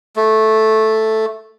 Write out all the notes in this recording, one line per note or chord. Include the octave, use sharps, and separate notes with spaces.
A3